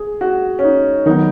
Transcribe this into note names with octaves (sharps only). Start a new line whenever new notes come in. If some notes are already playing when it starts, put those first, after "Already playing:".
Already playing: G#4
F#4
C#4
D#4
D#3 F#3 B3 D#4